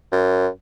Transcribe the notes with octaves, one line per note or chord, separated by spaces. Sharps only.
F#2